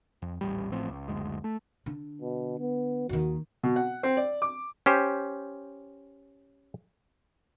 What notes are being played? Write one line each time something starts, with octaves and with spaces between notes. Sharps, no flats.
F2
D#1 A1 G3
A1 A2 F3 C4
C#2
F#1 D2 G#3
A3
D3
B2
B3
D#2 D#3 F#4
B2
F#5
C4
D5
D6
C#4 G4 C5